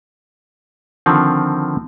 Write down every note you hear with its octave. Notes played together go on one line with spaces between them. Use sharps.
D3 D#3 F3 C4